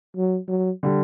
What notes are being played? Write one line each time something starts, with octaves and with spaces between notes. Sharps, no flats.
F#3
F#3
D3 G3